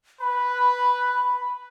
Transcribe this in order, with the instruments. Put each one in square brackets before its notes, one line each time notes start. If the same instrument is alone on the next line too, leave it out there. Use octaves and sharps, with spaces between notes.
[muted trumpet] B4 [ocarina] B5